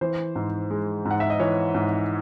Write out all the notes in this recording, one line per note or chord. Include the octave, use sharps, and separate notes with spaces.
E3 C5
G#2
G#3
G#2
F#5
E5
D#5
E3 C#5
G#2